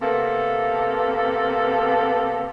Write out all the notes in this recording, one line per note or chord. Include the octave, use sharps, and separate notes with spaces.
C3 A#3 B3 A4